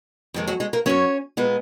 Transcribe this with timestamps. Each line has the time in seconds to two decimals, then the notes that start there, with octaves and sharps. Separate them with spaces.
0.34 F2 D#3 G#3
0.47 F#3 F#4
0.60 G#3 G#4
0.73 A#3 A#4
0.86 F#2 D#3 F#3 C#4 C#5
1.37 A#2 G#3 B3